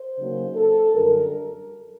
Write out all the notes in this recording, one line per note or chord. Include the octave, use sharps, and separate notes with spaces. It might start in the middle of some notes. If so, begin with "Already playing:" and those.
Already playing: C5
C#3 F#3 A#3 D#4
A4
F#2 D3 G3 A#4